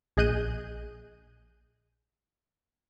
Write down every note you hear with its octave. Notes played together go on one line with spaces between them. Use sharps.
A#1 G#4 D#5 F#6 G6 D#7